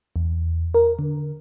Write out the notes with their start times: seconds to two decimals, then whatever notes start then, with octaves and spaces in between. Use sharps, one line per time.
0.16 E2
0.74 A#4
0.99 D3